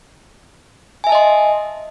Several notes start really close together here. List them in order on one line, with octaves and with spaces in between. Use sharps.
G#5 E5 A5 D#5 C6